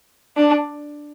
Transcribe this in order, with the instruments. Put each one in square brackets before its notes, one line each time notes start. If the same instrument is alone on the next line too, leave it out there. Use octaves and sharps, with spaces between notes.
[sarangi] D4